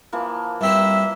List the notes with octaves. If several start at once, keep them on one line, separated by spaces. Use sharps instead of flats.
E3 F3 A#3
G2 C4 E4 E5